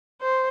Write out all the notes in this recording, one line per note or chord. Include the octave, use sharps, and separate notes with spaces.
C5